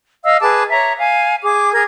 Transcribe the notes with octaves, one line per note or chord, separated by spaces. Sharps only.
D#5 F5 E6
G#4 B4 A5 D6
C#5 E5 A#5
F5 G#5
G#4 D6
G#4 A#4 G#6